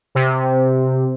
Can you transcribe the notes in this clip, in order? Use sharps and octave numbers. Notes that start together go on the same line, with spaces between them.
C3